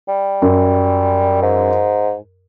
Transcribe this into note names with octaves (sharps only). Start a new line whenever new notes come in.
G3
F#2
G#2